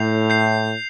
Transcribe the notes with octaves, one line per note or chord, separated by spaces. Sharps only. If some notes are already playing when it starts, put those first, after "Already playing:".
Already playing: A2 G6 C7 F7
G6 C7 F7